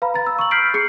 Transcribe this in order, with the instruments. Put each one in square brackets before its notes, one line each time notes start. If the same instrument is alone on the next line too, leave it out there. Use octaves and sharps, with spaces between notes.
[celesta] B4 F5 A#5 B5
A#5 B5 A6
E6
C#6 E6 F#7
F6 G6 B6 C7 D7 F#7
G#4 C7 C#7